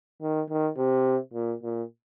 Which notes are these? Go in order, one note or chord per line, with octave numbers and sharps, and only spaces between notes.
D#3
D#3
C3
A#2
A#2